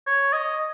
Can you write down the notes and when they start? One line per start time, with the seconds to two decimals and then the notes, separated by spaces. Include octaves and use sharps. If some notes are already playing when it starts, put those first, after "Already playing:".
0.07 C#5
0.33 D#5